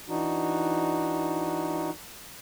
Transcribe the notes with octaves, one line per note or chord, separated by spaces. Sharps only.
E3 D4 D#4 F#4